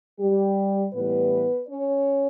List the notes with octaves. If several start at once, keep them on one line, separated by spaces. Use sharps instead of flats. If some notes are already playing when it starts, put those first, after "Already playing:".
G3 G4
A2 E3 G3 B3 B4
C#4 C#5